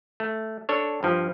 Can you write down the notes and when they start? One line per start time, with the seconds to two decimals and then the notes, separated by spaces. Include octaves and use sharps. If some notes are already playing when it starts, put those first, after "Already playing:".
0.20 A3
0.69 D4 A4 C#5
1.03 G2 F3